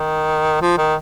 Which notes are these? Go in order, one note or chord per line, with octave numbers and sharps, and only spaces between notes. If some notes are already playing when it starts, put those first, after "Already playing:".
Already playing: D#3
F3
D#3